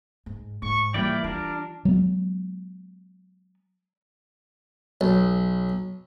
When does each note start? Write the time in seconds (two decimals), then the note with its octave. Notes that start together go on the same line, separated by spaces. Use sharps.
0.26 G#2
0.62 G#2 C#6
0.94 E3 F3 G3 A#3 E4 D5 G5
1.24 D4 F4 A#4
1.85 F#3 G#3 B3
5.01 B1